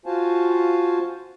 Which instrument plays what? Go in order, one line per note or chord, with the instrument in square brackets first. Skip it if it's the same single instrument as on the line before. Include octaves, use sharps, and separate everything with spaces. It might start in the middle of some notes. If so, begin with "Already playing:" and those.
[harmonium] F4 F#4 C5 F5 G#5 A5